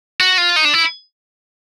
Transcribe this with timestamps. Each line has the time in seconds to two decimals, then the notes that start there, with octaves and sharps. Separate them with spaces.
0.21 F#4
0.38 F4
0.56 D#4
0.65 D4
0.74 E4